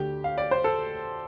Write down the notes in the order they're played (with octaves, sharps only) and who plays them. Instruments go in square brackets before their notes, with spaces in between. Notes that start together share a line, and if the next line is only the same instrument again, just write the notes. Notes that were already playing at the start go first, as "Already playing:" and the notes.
Already playing: [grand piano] D2 D3 A3 G4
F5
D5
C5
A4